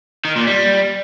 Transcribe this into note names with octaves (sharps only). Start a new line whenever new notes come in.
D#3
A#2
G3